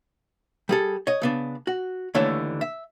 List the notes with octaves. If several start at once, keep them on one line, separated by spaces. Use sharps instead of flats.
G3 G#4 A4
C#5 D#5
C#3 B3 D4
F#4
D#2 D3 E3 A3 C#5
E5